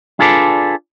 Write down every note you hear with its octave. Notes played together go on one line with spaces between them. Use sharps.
D4 F4 G#4 A4 B4 D5